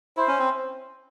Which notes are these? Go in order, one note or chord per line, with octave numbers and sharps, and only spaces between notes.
E4 C5
C#4
C4